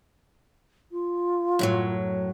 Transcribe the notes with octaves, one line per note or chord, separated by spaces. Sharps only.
F4
F#2 A2 F#3